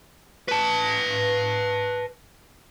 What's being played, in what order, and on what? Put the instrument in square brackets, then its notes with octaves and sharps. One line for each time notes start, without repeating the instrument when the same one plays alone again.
[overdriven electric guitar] B4 A5